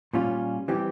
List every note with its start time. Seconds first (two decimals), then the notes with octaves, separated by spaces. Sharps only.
0.13 A#2 G3 C#4 F4
0.68 E3 G3 C4 G4